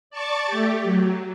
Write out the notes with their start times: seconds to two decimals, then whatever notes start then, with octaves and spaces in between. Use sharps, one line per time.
0.10 D5 A5 C#6 D6 A6
0.47 A3 G4
0.83 F#3